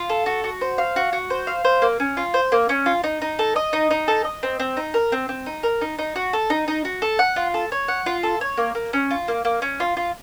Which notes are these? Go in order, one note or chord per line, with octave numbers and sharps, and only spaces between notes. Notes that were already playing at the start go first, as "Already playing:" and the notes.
Already playing: F4
A4
F#4
F#4
C5
F5
F#4
F#4
C5
F5
C5
A#3
C#4
F4
C5
A#3
C#4
F4
D#4
D#4
A4
D#5
D#4
D#4
A4
D#5
C4
C4
D#4
A#4
C4
C4
D#4
A#4
D#4
D#4
F#4
A4
D#4
D#4
F#4
A4
F#5
F4
A4
C#5
F#5
F4
A4
C#5
A#3
A#3
C#4
F4
A#3
A#3
C#4
F4
F4